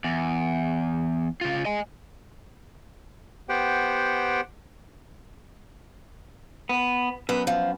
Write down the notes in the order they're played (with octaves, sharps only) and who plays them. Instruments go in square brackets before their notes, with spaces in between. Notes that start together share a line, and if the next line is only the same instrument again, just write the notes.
[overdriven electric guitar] E2
C#3 F4
D#5 G#5
[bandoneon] B3 G4 C5 F#5 G5
[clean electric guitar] B3
[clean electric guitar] F#2 [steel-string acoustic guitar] B3
[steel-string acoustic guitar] F3